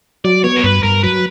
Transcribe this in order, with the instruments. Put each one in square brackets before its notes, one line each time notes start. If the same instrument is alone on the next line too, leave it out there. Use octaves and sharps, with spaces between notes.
[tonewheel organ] F#3 [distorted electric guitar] D5
[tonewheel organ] B3 [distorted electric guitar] C#5
[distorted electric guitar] A#4
[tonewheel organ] G2 [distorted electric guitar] B4
[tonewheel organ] G2 [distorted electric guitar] A#4
[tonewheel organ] F#3 [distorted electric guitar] B4